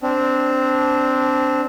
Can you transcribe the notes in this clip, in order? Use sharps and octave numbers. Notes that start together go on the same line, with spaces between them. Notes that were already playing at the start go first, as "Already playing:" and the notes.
C4 D4